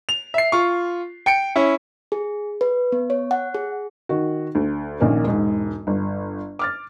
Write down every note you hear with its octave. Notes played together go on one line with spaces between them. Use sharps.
F7
E5 C7
F4 C#6
G5 C#7 D7
C#4 E4
G#4
B4
B3
C#5
F#5
G#4
D#3 F#4
D2
A#1 A#2 D#3 A#3 C#4
E1 G#2
G1
D6 F6 A6